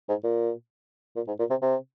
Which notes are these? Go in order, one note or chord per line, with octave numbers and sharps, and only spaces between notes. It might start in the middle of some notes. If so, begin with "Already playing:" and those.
G#2
A#2
A#2
G#2
A#2
C3
C3